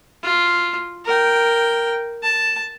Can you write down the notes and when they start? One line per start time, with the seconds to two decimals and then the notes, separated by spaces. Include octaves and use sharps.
0.24 F4
1.05 A#4 G5
2.23 A5